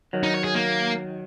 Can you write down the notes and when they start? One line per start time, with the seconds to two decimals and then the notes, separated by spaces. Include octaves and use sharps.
0.13 D#3 F#3
0.23 D#4
0.34 C#5
0.44 G#4
0.55 A#3